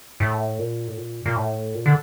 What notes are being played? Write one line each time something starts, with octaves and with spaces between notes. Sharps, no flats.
A2
A#2
A2
A#2
A#2
A2
A#2
D3